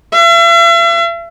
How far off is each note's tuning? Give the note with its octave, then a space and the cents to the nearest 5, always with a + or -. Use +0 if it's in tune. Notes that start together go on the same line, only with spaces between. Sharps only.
E5 +45